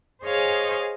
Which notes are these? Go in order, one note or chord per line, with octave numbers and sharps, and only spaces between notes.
G#4 C5 C#5 D#5 F5 G#5